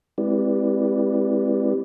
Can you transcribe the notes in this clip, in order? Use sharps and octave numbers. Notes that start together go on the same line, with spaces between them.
G#3 C4 E4 G4 B4 D5